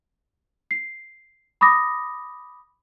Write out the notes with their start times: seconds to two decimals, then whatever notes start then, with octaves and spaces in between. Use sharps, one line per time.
0.71 C7
1.61 B5 D6 D#6 A#6